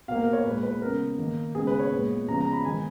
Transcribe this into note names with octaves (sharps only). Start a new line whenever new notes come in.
B2 A#3 F5
A#4
C#5
A#2 G#3 B3 B4
B4
C#3 G#3 B3 A#4
D#3 A#3
C#3 G#3 B3 G#4
B4
C#5
A#2 G#3 B3
C#3 F3 G#3 B3 A#5
A#5
B5
D#3 G#3 B3 G#5